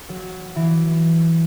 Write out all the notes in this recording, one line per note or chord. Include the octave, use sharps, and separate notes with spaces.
F#3
E3